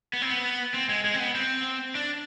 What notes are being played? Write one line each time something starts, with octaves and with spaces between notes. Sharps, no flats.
B3
C4
B3
C4
G#3
G#3
C4
B3
C4
D4